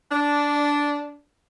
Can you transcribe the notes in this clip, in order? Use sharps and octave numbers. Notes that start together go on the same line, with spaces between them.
D4